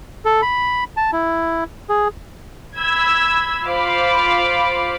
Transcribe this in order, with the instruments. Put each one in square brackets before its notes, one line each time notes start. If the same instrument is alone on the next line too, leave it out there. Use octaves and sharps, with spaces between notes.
[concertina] A4
B5
A5
E4
G#4
[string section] B5 E6 G#6
F4 C5 F5 B5 D6